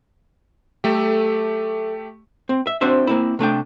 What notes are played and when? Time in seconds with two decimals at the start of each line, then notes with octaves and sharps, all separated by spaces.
0.84 F#3 A3 G4 A4 E5
2.49 C4
2.67 E5
2.81 C4 D4 F#4 C5 E5
3.07 A#3 C4 E4
3.39 C3 A3 D4 G5